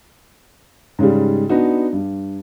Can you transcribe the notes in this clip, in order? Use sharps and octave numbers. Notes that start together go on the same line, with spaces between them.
G#2 C#3 G3
B3 D4 D#4 F#4
G2